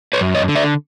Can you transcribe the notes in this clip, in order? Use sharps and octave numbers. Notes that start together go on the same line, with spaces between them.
B4 C#5
F#2
C#5 D#5
D3
D5 E5